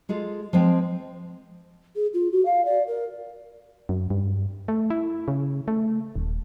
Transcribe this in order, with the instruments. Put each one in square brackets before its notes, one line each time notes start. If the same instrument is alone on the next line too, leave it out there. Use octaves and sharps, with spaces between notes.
[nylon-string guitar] G#3 F4 G#4 A4
F3 G#3 C4
[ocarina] G#4
F4
F#4
F5
D5
A#4
[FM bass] F#2
G2
A3
E4
C#3
A3
D#1